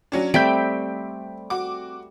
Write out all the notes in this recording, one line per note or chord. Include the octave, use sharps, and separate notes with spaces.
F#3 C#4 D4
G3 A3 C4 G6 B6 D7
F#4 D6